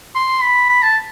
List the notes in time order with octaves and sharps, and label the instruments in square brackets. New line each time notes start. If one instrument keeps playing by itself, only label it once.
[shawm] C6
B5
B5
A5